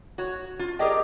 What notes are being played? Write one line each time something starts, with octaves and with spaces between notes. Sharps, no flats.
F#4 C#5
F4
G4 G#4 A#4 D5 D#5 G5